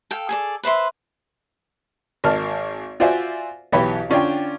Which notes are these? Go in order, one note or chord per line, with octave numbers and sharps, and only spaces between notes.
A4 F5 G5
G#4 A4 D5
B4 C5 E5 C6
G#1 A#3 A5 F6
F4 F#4 C5 D5 E5 G#5
B1 E3 G4 B4 C#5 B5
D3 C#4 D4 F4 G5